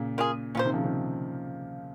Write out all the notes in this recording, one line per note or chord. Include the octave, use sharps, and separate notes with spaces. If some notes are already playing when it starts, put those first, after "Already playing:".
Already playing: A#2 C#3
A#3 F4 G#4
A#2 C#4 F4 C5
C3 D#3
C#3 F3
C3 D#3